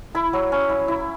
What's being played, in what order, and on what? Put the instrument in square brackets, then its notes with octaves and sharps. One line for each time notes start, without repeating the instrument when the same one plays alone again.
[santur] E4 B5
F#3
C#4
E4
E4